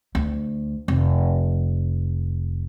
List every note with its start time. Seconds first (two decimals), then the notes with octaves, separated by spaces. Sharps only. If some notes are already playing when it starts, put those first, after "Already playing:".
0.15 D2
0.88 F1